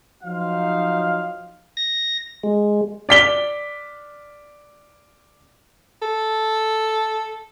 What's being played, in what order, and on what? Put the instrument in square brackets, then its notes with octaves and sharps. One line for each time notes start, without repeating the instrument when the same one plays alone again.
[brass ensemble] F3 F#3 D#4 C5 F5
[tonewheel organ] A#6
G#3
[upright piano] D5 B6 G7
[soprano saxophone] A4